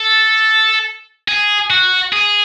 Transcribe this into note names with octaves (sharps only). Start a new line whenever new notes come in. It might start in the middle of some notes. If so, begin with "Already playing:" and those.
Already playing: A4
G#4
F#4
G#4